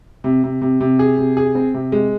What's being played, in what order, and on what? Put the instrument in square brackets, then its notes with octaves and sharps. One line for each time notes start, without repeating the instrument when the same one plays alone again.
[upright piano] C3
C3
C3
C3
G#4
C3
G#4
C4
C3
G#3